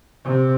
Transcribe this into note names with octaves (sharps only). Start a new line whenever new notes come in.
C3